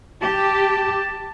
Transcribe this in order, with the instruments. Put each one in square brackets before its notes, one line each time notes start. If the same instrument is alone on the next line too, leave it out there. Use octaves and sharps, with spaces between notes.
[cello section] G4 [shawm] A5